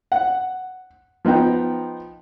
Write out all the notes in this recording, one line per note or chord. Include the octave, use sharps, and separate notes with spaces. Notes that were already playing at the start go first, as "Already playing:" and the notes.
F#5
F3 B3 D#4 G5